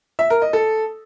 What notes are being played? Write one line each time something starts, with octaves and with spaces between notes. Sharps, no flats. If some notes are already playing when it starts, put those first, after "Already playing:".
E5
A#4
D#5
A4